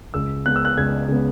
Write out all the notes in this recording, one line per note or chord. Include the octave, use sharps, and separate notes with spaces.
C#2 E6
C#3 G#3 B3 F#6
E6
F#6
C#2 G#6
C#3 G#3 B3